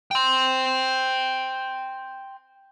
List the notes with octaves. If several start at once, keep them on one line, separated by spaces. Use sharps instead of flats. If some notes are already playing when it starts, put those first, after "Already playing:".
G5 C6